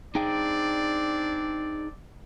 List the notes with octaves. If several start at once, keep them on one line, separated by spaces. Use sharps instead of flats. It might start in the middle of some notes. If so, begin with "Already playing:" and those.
C4 D4 D#4 G#4 D5 G5